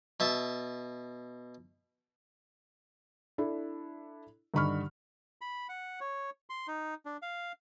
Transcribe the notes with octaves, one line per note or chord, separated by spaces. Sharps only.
B2 E5 A5
D4 E4 A4
G2 D3 D#3 B5 C#6 F6
B5
F#5
C#5
C6
D#4
D4
F5